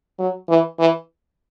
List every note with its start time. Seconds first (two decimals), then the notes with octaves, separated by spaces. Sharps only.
0.19 F#3
0.49 E3
0.79 E3